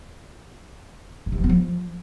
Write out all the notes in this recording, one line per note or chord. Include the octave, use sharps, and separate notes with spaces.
C#3
C3
F3
B3
F3